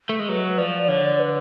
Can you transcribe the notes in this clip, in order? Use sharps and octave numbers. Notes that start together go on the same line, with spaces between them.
A3
G#3
F#3 B4
F3 D5
D5
D3 C#5
D5
B4